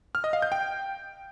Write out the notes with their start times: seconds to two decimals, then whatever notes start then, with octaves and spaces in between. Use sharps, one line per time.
0.15 F6
0.24 D#5
0.33 F5
0.42 G6
0.52 G5